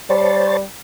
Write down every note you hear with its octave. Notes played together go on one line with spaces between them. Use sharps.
G3 C5 C#5 A5